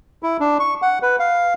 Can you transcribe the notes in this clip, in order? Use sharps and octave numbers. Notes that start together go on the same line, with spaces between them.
E4
D4
C#6
F#5
B4
F5